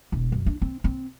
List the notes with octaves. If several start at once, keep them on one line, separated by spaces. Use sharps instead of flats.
E1
F#2
D4
C4
C4